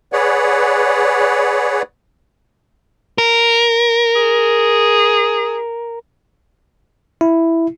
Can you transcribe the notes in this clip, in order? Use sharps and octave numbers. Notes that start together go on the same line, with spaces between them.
G#4 B4 C#5 D5 F#5
A#4
G#4
E4